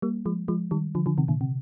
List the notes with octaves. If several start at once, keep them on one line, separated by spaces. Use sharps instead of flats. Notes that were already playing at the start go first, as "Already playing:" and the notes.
G3 A#3
F3 G#3
F3 G#3
D#3 G3
D3 F3
D3 F3
C3 D#3
A#2 D3
C3